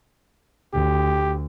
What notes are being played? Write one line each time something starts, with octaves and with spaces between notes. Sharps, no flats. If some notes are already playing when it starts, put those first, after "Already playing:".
D2 G4